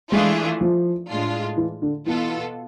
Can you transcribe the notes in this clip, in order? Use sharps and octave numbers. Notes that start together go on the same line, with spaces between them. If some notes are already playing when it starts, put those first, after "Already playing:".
E3 G#3 A3 D4 F4 G#4
F3
A2 G#3 D4 F4
E3
D3
B2 E3 B3 F4 A4